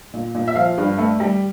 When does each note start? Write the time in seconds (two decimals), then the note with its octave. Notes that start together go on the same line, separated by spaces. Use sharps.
0.13 A#2
0.35 A#2
0.47 E5
0.55 F3 F5
0.78 G2
0.98 A3
1.20 G3